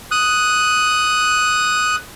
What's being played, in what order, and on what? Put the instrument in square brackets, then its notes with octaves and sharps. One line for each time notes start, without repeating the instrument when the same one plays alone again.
[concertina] D#6 F#6